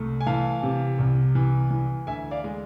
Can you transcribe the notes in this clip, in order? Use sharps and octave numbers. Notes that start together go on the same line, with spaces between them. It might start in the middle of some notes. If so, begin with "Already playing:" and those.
Already playing: C2 A3
G#5
E3 F5 A5
C3
C2
E3
E3
D2 E5 G#5
D5 F5
G#3